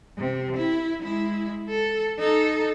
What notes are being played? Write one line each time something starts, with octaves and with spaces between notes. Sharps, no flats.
C3
E4
G#3 E4
A4
D#4 A4